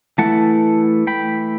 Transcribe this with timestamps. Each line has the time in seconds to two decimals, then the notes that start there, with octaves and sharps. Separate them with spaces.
0.18 E3 A3 E4 F#5 A5
1.07 G5 B5